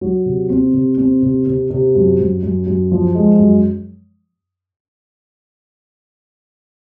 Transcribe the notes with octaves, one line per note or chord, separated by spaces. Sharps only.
F#3
C3
C4
C3
C4
C3
C3
C3
F#2
F#2
F#2
F#2
F3
G#3
F#2